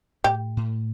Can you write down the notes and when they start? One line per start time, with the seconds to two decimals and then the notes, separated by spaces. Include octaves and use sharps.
0.24 A2 G4
0.57 A2